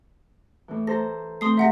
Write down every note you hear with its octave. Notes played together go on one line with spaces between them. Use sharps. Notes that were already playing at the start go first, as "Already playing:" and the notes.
A2 E3
A4 C5 A#5 A#6
A3 C4 C6 D#6 C7
G#2 C3 E5 F#5 A#6